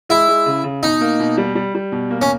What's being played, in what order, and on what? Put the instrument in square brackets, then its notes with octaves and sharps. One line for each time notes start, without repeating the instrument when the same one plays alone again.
[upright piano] G#3 [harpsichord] E4
[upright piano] G#3
C#3
C#3
[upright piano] B2 [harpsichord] D#4
[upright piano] A#3
B2
G3
G3
G3
B2
A#3
[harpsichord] C#4